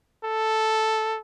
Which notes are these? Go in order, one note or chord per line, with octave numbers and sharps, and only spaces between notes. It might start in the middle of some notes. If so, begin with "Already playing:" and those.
A4